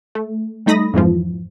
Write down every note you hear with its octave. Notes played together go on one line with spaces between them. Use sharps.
A3
G3 A3 D#4 B5 D#6 A#6
F2 G#2 E3 F3